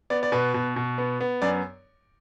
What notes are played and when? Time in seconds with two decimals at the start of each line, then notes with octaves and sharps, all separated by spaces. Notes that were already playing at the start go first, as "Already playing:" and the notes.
0.10 B3 D5
0.23 D5
0.32 B2 B4
0.54 B2
0.76 B2
0.98 B3
1.21 B3
1.42 F#2 D5